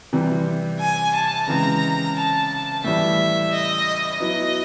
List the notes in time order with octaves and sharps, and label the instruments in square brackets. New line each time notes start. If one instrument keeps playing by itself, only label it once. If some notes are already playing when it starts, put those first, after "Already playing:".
[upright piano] C3 E3 G3 C4
[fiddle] G#5
A5
[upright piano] C#3 E3 G#3 C4 [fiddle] A#5
[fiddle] A5
[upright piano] A2 E3 G3 [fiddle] E5
[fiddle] D#5
[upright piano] F#3 B3 E4 [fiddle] D#5